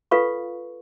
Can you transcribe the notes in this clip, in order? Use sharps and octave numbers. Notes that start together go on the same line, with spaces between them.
F4 A4 B4 F5 C#6